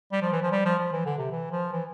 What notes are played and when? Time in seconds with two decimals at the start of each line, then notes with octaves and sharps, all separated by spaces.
0.12 G3
0.21 F3
0.32 E3
0.42 F3
0.52 G3
0.65 F3
0.79 F3
0.92 E3
1.06 D3
1.18 C3
1.32 E3
1.51 F3
1.72 E3